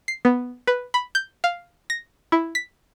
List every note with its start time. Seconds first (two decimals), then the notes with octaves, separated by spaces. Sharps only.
0.08 C7
0.25 B3
0.67 B4
0.94 B5
1.15 G6
1.44 F5
1.90 A#6
2.32 E4
2.55 B6